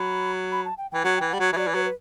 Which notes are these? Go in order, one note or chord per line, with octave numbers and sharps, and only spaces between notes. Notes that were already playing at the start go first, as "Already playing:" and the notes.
Already playing: F#3 B5
B5
A5
G5
E3 G5
F#3 F#5
E3 G5
G3 F#5
F#3
E3 E5
F#3 D5
E3
F#3 B4
B4